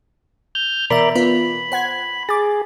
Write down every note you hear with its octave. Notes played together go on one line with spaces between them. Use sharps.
F6 G6
B2 E3 A#4 D5 E5 B5
B3 F4 B4 B5
C5 F#5 G#6
G#4 D6 A6